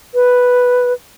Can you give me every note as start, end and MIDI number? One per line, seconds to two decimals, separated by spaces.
0.14 0.93 71